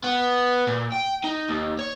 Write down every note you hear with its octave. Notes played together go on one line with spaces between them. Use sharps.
B3
A#2
G5
D#4
D#2
C#5